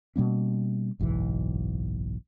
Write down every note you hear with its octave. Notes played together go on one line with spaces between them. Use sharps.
B2 G3 A#3 C#4
F#1 B1 G#2 E3